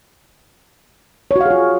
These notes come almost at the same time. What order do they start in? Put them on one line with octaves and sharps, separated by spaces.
C#5 F#4 F5 G#4 F4